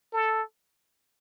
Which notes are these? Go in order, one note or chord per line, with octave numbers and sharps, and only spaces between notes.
A4